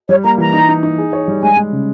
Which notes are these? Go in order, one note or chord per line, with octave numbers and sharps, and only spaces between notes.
G3 C#5
A#3 A#5
E3 A#5
D#4
D#4
D#4
G#4
C#5
G3
G#3 G#5
G#3
C#3